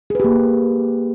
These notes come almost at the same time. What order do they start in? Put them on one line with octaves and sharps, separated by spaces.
G#4 B4 G4 A#3